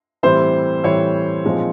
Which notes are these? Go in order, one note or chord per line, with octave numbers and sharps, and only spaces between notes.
A2 E3 G3 C4 C5
A2 E3 G3 C4 C#5
A#2 F3 G#3 C4 D#4